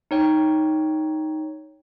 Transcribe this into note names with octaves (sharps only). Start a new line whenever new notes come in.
D#4 C#5 G5